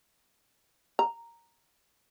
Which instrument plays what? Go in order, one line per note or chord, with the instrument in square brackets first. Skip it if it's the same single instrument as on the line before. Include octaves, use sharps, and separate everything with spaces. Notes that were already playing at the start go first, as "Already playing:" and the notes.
[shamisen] A#5